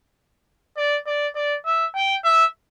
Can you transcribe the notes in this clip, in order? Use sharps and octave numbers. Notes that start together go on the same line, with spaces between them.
D5
D5
D5
E5
G5
E5